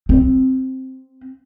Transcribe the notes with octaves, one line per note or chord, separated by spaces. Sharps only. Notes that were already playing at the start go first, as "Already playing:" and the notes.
C4